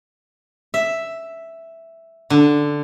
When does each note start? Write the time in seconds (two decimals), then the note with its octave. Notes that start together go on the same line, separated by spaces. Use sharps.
0.74 E5
2.30 D3